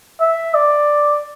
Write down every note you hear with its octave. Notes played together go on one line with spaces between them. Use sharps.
E5
D5